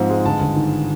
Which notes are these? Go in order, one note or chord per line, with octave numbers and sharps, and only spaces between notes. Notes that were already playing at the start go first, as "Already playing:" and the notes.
Already playing: G#2 F3 C4
G#3
G1 A5
G1
D#3